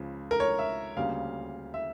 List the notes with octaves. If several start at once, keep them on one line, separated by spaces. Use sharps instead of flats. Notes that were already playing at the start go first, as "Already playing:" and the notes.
Already playing: C#2 C#3 F3
A#4
C#5
E5
D2 C#3 G3 A#3 F5
E5